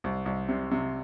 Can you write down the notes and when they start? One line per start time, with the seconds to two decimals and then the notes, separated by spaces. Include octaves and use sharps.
0.04 C2
0.26 C2
0.49 C3
0.71 C3